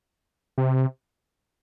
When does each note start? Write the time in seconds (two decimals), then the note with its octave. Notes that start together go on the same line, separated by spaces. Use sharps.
0.58 C3